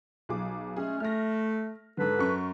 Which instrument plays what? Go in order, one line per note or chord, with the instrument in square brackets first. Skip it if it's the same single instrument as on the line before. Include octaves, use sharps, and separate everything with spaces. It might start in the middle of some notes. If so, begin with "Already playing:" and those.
[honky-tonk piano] B1 G#4 D6
[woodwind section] G#3 A3 C#4 [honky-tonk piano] G#4
[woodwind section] A3 [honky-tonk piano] F6 A#6
[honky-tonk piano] G#2 D3 [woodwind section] A4 B4
[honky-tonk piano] F#2 C#6